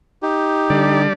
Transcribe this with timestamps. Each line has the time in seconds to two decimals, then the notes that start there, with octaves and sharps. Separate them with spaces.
0.23 D#4 G4
0.70 D3 G3 D5